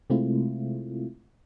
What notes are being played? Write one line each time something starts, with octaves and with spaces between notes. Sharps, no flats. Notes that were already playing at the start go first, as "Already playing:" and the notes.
C3 G#3 A3 C4 E4 F4